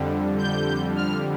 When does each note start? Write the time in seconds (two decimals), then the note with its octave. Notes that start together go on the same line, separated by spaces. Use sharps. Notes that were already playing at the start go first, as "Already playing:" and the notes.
Already playing: F2 D3 G3
0.38 G6
0.96 F6